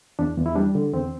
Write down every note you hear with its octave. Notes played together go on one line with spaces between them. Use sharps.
E2 D4
E2
E4
G3 D4
D3
E2 C4